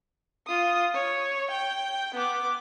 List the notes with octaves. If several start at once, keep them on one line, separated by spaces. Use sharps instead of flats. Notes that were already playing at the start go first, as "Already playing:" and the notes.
F4 D#6
C#5
G5
B3 D6